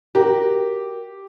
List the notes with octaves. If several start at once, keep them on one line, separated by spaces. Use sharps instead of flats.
F#4 G4 A#4